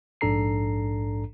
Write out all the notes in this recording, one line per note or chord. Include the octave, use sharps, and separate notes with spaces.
A#1 G#2 D4 A4 A#5 C7